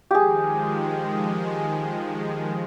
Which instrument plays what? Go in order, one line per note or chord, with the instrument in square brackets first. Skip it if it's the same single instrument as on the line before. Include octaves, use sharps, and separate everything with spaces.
[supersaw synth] D#3 F3 G#3 [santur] G4 G#4